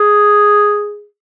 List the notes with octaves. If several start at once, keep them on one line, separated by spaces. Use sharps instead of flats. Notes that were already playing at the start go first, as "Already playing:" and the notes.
Already playing: G#4